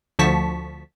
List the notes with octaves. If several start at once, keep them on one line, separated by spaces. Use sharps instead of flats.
D2 D3 F3 A5 C#6 B6